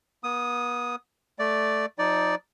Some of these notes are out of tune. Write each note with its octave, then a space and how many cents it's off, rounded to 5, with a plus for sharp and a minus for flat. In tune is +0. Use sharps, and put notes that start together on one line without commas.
B3 -40 D#6 +0
A3 +0 D5 +0
F3 +40 D#4 +10 D5 +0